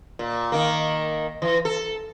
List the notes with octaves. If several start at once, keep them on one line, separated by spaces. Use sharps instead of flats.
A#2
D#3 A#3
E3
A4